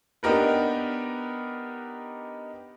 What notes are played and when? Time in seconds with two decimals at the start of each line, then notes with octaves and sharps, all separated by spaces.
0.23 B3 D4 D#4 G4 A#4 B4